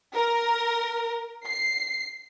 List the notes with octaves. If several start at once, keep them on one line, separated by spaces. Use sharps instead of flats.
A#4
C7